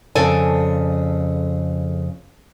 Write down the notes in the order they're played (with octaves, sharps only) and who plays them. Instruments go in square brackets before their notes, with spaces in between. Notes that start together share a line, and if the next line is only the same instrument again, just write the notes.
[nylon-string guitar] F2 C#3 A4 D5 G#5